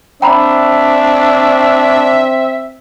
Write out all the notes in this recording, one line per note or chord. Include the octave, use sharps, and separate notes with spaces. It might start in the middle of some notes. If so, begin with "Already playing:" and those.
C4 D4 E5 G5 A#5 B5